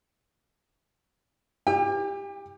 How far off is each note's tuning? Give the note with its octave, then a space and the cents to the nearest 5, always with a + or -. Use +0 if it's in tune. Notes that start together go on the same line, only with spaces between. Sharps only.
G4 +15 G5 +45